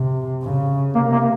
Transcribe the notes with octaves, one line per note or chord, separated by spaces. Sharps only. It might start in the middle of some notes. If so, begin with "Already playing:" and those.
Already playing: C3
C#3
C3 A#3
A#3